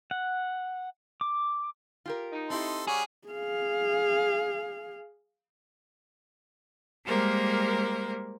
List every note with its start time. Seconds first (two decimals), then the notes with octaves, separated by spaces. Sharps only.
0.11 F#5
1.21 D6
2.06 F4 G4 A#4
2.32 D#4
2.50 C4 E4 G4 A4 C6
2.87 G3 C#4 F#4 G#4
3.28 G#4 F5
7.05 G3 G#3 A#3 A#4 C5